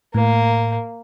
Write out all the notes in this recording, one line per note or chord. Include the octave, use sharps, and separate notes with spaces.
A2 A#3